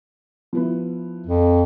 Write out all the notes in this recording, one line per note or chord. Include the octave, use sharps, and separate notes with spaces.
F3 B3 E4
F2